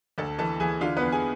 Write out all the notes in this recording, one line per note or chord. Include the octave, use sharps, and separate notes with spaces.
D2 A4 A5
E3 A4 A5
E3 G#4 G#5
D3 F4 F5
B3 B4
E2
G#4 G#5